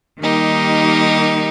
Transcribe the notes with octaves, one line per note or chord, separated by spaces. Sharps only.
D#3 G3 A#3 D#4 G4